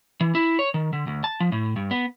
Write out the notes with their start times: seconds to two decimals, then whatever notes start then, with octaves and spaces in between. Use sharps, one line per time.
0.21 E3
0.35 E4
0.59 C#5
0.74 D#3
0.93 D3
1.07 D2
1.24 A5
1.40 F3
1.52 A2
1.76 G2
1.91 B3